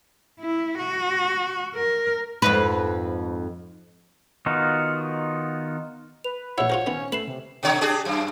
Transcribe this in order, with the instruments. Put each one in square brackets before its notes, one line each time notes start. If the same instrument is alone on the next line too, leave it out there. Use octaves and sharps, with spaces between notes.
[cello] E4
F#4
A#4
[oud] F2 G#2 B4
[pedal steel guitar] D#3 B3 D#4 F4 F#4
[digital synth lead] B4 [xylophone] F7
[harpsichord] A#1 E4 [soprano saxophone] C#5 [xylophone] F#5 E6
[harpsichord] F4 F#4 A#4 [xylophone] C5 F#5
[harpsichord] D#3 B3 [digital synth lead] C#4
[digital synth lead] A3 [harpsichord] B4 [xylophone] C7 E7 F#7
[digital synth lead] C3
[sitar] B2 D3 C#5
D4 G4 G#4
F#2